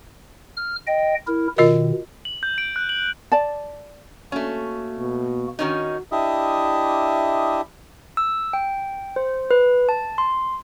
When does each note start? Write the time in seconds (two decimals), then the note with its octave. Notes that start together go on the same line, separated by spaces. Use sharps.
0.57 F6
0.87 D#5 G5
1.27 E4 A#4
1.58 B2 D#3 F4 A#4 D#5
2.25 F#7
2.43 G6
2.58 D7
2.76 F#6
2.89 F#7
3.32 D5 A5
4.32 A3 A#3 C#4 F#4
4.99 B2
5.59 D#3 C#4 D#4 F#4
6.12 D4 E4 G4 D#5 E5 D#6
8.17 E6
8.53 G5
9.16 C5
9.51 B4
9.89 A5
10.18 C6